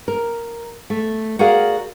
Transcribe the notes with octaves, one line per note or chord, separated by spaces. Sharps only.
A#4
A3
F#4 G#4 A#4 D5 F5